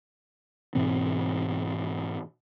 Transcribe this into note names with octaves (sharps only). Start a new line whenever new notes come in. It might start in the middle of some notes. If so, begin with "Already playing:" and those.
G#2 B2 E3 C4